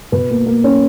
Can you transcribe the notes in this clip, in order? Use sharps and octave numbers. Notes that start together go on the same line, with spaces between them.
B2 B4
A#3
A#3
C#4